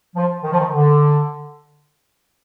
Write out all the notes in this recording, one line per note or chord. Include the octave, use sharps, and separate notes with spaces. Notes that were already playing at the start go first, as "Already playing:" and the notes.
F3
D#3
F3
D#3
D3